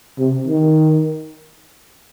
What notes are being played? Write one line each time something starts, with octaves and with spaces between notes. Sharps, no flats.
C3
D#3